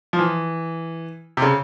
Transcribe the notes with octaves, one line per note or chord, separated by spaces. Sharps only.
F3
E3
C3
C#3